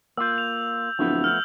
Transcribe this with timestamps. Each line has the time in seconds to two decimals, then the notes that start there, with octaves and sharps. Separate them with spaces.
0.17 A#3 F4 E6 G6
0.38 F7
0.99 D1 F3 A3 B3
1.24 F6 G6 F#7